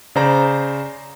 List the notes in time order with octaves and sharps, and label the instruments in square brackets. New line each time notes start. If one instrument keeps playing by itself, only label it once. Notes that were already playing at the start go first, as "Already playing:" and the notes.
[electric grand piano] C#3 C5 D5 A#5